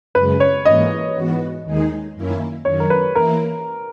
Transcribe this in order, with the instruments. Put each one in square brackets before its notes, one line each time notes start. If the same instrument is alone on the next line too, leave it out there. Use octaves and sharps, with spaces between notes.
[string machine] F#2 C#3 G#3 [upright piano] B4
[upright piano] C#5
[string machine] G#2 E3 A#3 [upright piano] D#5
[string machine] G#2 E3 B3 F#4
D#2 D#3 G#3 D#4 G#4
F#2 D#3 A#3 C#4 E4
[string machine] F#2 D#3 F#3 [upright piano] C#5
[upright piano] A#4
B4
[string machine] E3 A#3 E4 [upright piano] A#4